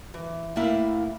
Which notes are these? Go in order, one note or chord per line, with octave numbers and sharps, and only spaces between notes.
E3
A2 A#3 E4 F5